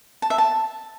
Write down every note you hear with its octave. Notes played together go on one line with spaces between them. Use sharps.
A5
E5
A5